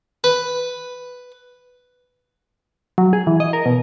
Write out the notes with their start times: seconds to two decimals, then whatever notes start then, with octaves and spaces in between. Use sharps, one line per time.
0.24 B4
2.98 F#3
3.13 G#4
3.27 E3
3.40 D#5
3.53 A#4
3.66 B2